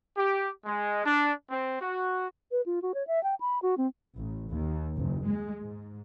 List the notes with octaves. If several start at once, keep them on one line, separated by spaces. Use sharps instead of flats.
G4
G#3
D4
C4
F#4
B4
F4
F#4
C#5
E5
G5
B5
F#4
C4
A1
D#2
F#1
G#3
G#2